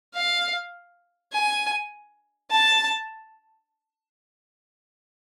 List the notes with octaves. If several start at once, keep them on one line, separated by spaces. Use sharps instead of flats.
F5
G#5
A5